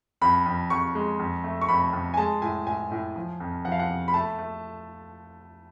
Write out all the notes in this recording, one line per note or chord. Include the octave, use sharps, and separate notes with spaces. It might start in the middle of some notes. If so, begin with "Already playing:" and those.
F2 B5
F2
F2 C#6
G#3
F2
A3
C#6
F2 B5
F2
G#5
G#3 A5
A2 G#5
A2 G#5
A2
F3
F2
F3 F#5
F5
F#5
F2
B5
A3 A5
A3